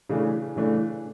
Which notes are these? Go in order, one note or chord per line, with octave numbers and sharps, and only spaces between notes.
C#3 E3 A3 D4
C#3 E3 A3 D4